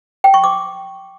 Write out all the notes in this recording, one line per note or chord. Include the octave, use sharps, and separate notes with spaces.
G5
C#6
D6